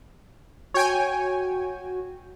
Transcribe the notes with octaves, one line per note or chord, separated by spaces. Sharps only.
F#4 C#5 G5 G#5